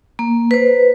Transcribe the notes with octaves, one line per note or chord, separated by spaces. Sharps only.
A#3
B4 C5